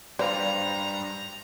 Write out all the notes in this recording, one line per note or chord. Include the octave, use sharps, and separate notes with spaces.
G2 G3 B4 C5 D5 F5 A#5